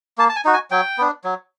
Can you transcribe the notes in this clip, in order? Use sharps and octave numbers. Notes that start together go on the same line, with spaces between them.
A#3 A5
A5
G#5
D#4 F#4
G#5
F#3 G5
B3 D4
F#3